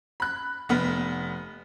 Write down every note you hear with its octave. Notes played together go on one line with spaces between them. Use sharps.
B5 F#6
F1 B3 F6